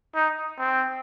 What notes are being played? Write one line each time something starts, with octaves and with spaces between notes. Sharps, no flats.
D#4
C4